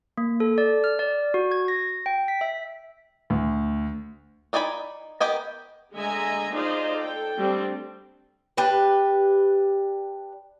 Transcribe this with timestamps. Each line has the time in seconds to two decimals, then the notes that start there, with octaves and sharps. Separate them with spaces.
0.18 A#3
0.40 A4
0.58 D5
0.84 F6
0.99 D5
1.34 F#4
1.51 G#6
1.68 A#6
2.06 G5
2.28 B6
2.41 E5
3.30 D2
4.53 D4 D#4 D5 G#5 B5
5.20 B3 G4 A#4 D#5 G#5
5.93 D3 G#3 D#5 E5 G#5 A#5
6.54 D#4 F4 G#4 C5 D5 D#5
6.96 A4 G5
7.36 G3 A3 C4 D4
8.57 D4 G4 B4